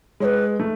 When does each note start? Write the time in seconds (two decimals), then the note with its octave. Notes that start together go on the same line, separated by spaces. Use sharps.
0.20 G#3 C#5
0.24 B4
0.60 A3